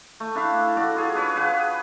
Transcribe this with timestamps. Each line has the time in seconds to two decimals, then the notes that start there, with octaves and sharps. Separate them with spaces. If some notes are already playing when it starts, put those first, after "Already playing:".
0.20 A3
0.35 D4 E4 E5 F5
0.77 F#4 A4 D5
0.96 F4 G#4 C#5
1.15 D4 B4 C#5
1.36 G#4 B4 F5 F#5